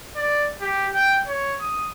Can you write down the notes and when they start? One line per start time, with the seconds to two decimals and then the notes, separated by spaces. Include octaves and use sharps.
0.16 D5
0.61 G4
0.94 G5
1.28 C#5
1.61 D#6